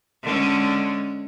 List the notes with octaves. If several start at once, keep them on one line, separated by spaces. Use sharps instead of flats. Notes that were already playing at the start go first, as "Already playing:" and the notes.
D3 G#3 C#4